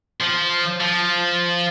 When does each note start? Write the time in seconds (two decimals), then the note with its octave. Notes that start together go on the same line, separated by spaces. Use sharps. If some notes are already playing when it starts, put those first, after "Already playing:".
0.21 F3
0.81 F3